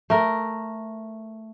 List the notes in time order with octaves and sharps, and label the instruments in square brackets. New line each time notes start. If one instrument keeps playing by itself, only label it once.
[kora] A3 A#4